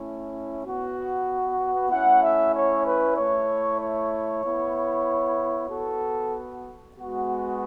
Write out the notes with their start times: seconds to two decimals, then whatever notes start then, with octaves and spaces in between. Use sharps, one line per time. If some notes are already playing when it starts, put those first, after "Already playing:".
Already playing: A3 C#4 E4
0.64 B3 F#4
1.90 A3 C#4 E4 F#5
2.22 E5
2.54 C#5
2.86 B4
3.16 A3 E4 C#5
3.79 C#5
4.43 B3 E4
5.68 B3 F#4 A4
6.96 G#3 B3 F#4